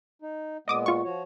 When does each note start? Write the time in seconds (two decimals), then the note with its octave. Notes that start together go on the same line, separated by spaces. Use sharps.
0.22 D#4
0.68 A#2 G#3 B3 D#5 D6 D#6
0.86 F4 C#6
1.05 F3 F#4 C#5